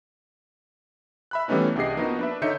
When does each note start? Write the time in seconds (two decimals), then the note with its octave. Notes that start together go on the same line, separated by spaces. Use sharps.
1.31 E5 B5 F#6
1.48 E3 G3 A3 B3 C#4 D#4
1.75 C2 D4 G4 G#4 D#5 C7
1.97 F3 A#3 B3 D#4 F#4 D#5
2.19 D4 B4 E5
2.42 D3 D#4 C#5 E5 G6 C#7